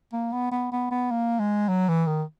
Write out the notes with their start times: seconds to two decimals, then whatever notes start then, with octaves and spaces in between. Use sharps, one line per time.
0.13 A#3
0.33 B3
0.52 B3
0.72 B3
0.91 B3
1.11 A#3
1.39 G#3
1.69 F#3
1.89 E3
2.07 D#3